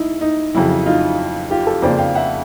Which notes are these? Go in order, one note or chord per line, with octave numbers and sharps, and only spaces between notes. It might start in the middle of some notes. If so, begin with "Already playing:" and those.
Already playing: D#4 E4
D#4
F2 C#3 F#3 E4
D#4 F4
F4 G4
G4 A4
F2 C#3 F3 A#3 C5 D5
F5 G5
E5 F#5